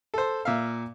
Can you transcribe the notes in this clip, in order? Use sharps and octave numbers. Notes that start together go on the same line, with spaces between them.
A4 C5
A#2 E5 F5